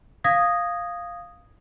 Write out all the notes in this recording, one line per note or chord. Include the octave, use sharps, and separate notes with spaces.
F5 D#6 G#6 A#6